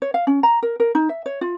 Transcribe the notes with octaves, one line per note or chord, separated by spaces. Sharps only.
C#5
F5
C#4
A#5
A#4
A#4
D#4
E5
C#5
F4